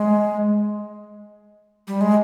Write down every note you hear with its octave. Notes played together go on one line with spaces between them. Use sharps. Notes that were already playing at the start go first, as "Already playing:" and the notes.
Already playing: G#3
G3
G#3